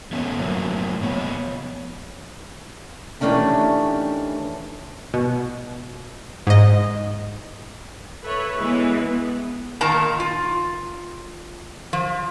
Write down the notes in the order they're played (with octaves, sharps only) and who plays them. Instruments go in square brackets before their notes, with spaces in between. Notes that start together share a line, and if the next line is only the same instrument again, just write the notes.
[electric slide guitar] F3 A3 B3 C#4
F#2 A2 F#3 A#3
F3 B3 C#5
[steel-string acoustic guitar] D#3 E3 A3 C#4 D4 G4
[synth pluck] B2
G#2 D#5
[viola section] A4 B4 C#5 E5
E3 G#3 B3 B4 E5
B3
[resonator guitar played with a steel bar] A#2 D#3 A#4 A5 A#5
F4
F3